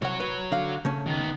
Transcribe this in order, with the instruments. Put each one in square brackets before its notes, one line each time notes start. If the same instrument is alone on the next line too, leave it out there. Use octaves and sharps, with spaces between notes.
[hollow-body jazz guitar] C2 F#5 [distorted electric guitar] F#4 C#5
[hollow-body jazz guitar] B4
D3 F5
C#3 A3 C#4
[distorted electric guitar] D#3 B3